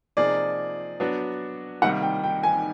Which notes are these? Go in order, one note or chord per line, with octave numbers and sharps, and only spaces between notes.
C3 F3 A#3 D#4 G#4 D5
F#3 B3 D4 F#4
C2 C3 D#3 G3 A#3 F#5
G5
G5
G#5